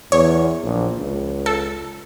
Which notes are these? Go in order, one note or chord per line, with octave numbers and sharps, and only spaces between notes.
E2 C#5
A#1
C#2
A4